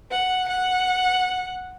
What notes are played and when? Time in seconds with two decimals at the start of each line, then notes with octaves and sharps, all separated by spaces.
0.11 F#5
0.48 F#5